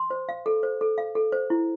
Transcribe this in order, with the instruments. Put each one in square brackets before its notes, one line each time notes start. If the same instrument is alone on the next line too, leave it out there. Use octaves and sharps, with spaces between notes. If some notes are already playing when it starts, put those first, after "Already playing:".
Already playing: [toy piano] C6
C5
F5
A4
C5
A4
F5
A4
C5
E4